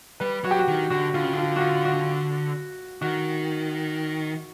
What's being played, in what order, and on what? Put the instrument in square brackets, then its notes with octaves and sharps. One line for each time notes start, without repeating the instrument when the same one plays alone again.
[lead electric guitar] G3 [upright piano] B4
[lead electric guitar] F#3 [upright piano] F#4
[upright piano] G4
F#4
[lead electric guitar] D#3
[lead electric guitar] D3 [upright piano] F#4
[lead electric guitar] D3 [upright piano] F4
[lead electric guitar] C#3
[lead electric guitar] D3 [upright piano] F4
[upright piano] F#4
F4
F#4
[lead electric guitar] D#3 [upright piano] F#4